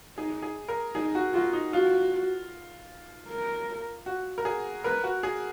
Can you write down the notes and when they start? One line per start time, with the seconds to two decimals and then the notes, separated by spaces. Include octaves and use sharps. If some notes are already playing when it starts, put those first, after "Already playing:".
0.17 D#4 G#4
0.42 G#4
0.68 A#4
0.95 D#4 G#4
1.15 F#4
1.34 F4 F#4
1.53 D#4
1.73 F4 F#4
3.29 A#4
4.06 F#4
4.38 A#4
4.45 G#4
4.84 A#4 B4
5.04 F#4
5.23 G#4